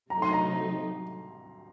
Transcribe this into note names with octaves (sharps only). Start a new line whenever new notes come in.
C3 F#3 A3 D#4 A#5
C6
A#5